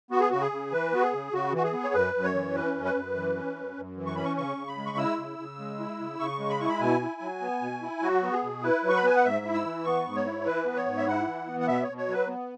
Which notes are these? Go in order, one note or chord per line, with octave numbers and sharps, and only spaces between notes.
B3 F#4
G#4
C#3 F#4
G#4
C#3
E3 B4
B3 F#4
G#4
C#3
C#3 F#4
E3 F#4
G#4
B3
C#5
F#2 B4
F#2
C#5
E3
C#4 B4
F#2
B4
F#2
E3
C#4
F#2
F#2
E3
C#6
C#4 B5
C#6
C#3 C#6
C#3
B5
G#3
C#6
E4 E6
C#3
C#3
G#3
E4
C#3
C#3 C#6
G#3
B5
E4 C#6
B5
B2 G#5
E4
F#3
B3
B2
E4
F#3 F#4
B3
G#4
B2
E4 B4
F#3
C#6
B5
B3 G#5
F#5
G#2 E5
E4
E6
E3
B3 C#6
G#2
C#5
E4
E3 B4
B3
C#5
G#2
E5
E4 F#5
E3
B3
F#5
B2 E5
B2 C#5
C#5
F#3 B4
B3